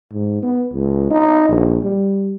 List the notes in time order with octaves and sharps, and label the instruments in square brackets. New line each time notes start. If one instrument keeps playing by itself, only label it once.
[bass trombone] G#2
B3
C#2
D#4
A#1
G3